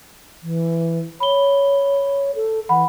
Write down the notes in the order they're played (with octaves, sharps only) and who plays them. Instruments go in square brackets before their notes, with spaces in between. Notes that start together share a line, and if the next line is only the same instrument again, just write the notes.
[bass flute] E3
[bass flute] C#5 [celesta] B5 G7
[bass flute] A4
[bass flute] E3 [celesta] F#5 B5